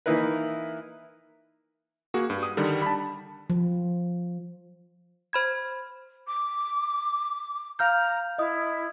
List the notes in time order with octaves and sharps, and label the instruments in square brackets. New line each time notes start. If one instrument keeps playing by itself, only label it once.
[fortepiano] E3 A#3 D#4 E4 A#4 B4
[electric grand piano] A#3 F#4 G#4
G2
D#6
D3 D#3 G3
A5 B5
[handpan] F3
[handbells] C5 B5 G#6
[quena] D6
[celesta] F5 F6 G6 [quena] A#5
[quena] E4 [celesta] D#5 D#6